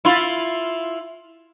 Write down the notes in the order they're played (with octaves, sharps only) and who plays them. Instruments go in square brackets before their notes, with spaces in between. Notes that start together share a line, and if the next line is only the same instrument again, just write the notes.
[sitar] E4 F4